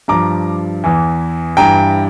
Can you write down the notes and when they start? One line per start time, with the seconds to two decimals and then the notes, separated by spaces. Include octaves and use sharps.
0.08 G2 F3 A#5 D6
0.84 E2 E3
1.57 G2 E3 G5 A#5